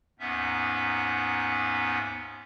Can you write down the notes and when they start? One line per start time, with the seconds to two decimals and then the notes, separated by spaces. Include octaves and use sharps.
0.19 D#2 G#2 B3 C#4 E5